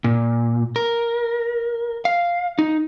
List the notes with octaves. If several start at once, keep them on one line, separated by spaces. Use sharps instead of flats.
A#2
A#4
F5
D#4